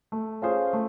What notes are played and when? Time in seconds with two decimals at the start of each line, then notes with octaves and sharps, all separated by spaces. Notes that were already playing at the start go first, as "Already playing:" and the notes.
0.12 A3
0.42 C#4 F4 G#4 C5
0.73 A3